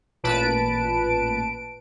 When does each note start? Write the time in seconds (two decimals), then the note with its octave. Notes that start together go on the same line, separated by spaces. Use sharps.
0.23 A1 A#2 B4 A5 D7